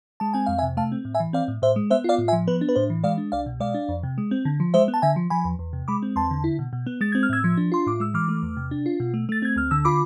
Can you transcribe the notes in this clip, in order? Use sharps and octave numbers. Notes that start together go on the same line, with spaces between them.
G#3 A5
C4 G#5
F2 F5
E5 G#5
C3
A3 F5 A5
C4
A2
E5 G#5
E3
C4 D5 F5
A2
A2 C5 E5
G#3
B3 C5 E5
F4 D5 F5
A2
E5 G#5
F3
B3 B4
D4
B4
A2 C5
E3
G#3 D5 F5
D4
C2 D5 F5
B2
G#3 D5 F5
D4
F2
C3
G#3
C4
D3
F3
G#3 C5 E5
B3
A5
D3 E5 G#5
F3
F3 G#5 B5
E2
E2
C3
G#3 B5 D6
C4
E2 A5 C6
D3
E4
B2
B2
B3
G#3 A6
C4 G#6
F6
A2 E6 G#6
F3
D4
F4 C6
A2 D6
G#3 E6
E3 D6 F6
A3
E2
C3
D4
F4
B2
A3
A3 A6
C4 G#6
D2 F6
D3 E6
F4 B5 D6